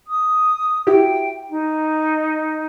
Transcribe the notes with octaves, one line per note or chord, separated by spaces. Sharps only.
D#6
E4 F#4 G4 G5
D#4